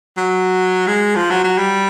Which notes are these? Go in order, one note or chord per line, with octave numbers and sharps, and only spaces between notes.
F#3
G#3
F3
F#3
F#3
G3